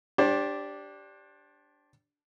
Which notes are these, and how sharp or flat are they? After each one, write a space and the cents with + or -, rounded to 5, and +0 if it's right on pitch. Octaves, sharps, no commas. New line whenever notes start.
D4 -5 G4 +0 C5 +35